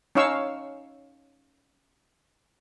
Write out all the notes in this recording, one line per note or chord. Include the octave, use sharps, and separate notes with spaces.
C#4 D#4 C#5 F5 C#6 E6